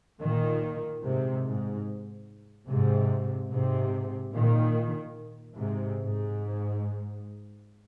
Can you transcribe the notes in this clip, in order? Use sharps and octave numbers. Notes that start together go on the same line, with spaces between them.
A#2 D#3
G#2 C3
G#2
G#2 C3
G#2 C3
A#2 D#3
G#2 C3
G#2